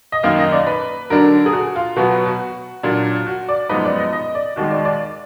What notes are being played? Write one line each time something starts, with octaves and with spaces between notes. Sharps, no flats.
D#5
F#2 D#3 A#3 D#4 F5
D#5
D5
B4
D3 F#3 D4 A#4
G#4
F#4
F4
B2 F#3 B3 F#4
F#4
A#2 F#3 D4
F#4
D5
F#2 F3 G#3 B3 D#4 B4
D5
D#5
D#5
D5
D#2 D#3 G#3 F#4
D5
D5